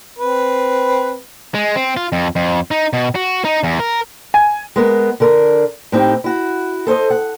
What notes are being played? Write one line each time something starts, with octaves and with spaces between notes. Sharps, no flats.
C4 B4
G#3
C4
F4
F2
F2
D#4
B2
F#4
D#4
E2
A#4
G#5
G#3 B3 A#4
D3 D4 A#4
A2 C4 D#4 G4
E4 F#4
A4 C5 C#5 D#5
F#5